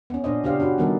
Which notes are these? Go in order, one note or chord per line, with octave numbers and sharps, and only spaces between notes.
B3 C#4
A#2 D4 C5 D#5
C#3 D4 G4 C5 F5
C#4 D4 F#4 B4
D#3 G3 A#3 B3 D#4 A4